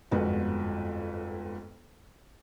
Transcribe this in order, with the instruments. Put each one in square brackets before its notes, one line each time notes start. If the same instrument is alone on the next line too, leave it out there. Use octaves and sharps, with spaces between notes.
[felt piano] G1 F2 G#2 B3 F#4